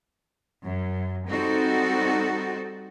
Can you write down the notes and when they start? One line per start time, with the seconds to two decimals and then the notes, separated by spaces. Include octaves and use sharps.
0.64 F#2
1.28 G3 C4 D#4 F#4 A4